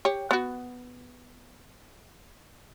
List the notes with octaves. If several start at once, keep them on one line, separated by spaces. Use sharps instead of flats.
G4 C#5
B3 F#4